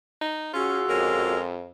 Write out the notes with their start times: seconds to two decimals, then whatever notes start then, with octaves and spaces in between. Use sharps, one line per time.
0.22 D#4
0.54 C#4 F4 F#4 G#4 E6
0.89 F2 G#3 C#4 A#4